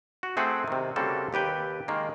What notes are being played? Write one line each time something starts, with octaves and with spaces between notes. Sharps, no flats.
F#4
A3 C4 G#4 F#5
C3 D#3
C#3 G3 A#3 C4 F#4 A4
D#2 G4 B4 G5
D#3 G#3 A#3